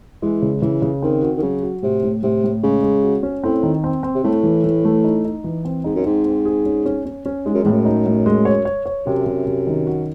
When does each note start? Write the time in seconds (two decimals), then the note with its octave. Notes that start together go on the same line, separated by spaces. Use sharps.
0.22 E3 G#3
0.42 C#3
0.62 C#3 E3
0.82 C#3
1.02 D#3 C4
1.22 F#4
1.37 D#3
1.42 C#3 F#3
1.62 F#4
1.82 A2 C3
2.03 A2
2.23 A2 C3
2.44 A2
2.63 C#3 G#3
2.83 G#3
3.03 F#4
3.23 C#4
3.44 A2 C4
3.63 D#3
3.84 C4
4.03 C4
4.15 C3
4.23 A2 A3
4.43 E3
4.64 E3
4.85 A3
5.04 D#4
5.25 D#4
5.44 E3
5.65 C4
5.84 G#2 D#4
5.95 F#2
6.04 G#2 C4
6.25 C4
6.45 G#4
6.66 C#4
6.86 C#4
7.06 C#4
7.26 C#4
7.45 G#2 G#3
7.54 F#2
7.64 E2 A2
7.72 F#2
7.85 D#4
8.06 A2
8.26 G#3
8.45 C#5
8.65 C#5
8.86 C#5
9.06 F#2 C3
9.26 C3
9.46 C3
9.67 D#3
9.87 F#4